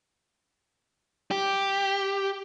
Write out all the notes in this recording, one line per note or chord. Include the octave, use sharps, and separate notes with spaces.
G4